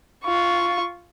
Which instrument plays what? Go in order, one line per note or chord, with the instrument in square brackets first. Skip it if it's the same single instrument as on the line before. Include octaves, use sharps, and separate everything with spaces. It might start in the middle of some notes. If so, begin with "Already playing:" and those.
[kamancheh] F4 C#6